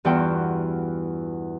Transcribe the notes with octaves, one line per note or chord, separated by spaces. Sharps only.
E2 G2 E3 F4 F#4 G5